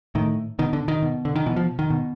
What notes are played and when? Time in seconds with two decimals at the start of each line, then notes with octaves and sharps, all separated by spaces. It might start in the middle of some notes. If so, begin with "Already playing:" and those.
0.15 A2 D#3
0.59 B2 D#3
0.73 D3
0.88 D#3
1.02 B2
1.25 D3
1.36 D#3
1.46 B2 E3
1.56 F3
1.79 D#3
1.90 B2